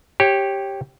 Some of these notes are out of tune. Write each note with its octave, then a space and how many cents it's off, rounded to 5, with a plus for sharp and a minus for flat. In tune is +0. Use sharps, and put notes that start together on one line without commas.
G4 +0 C#5 -20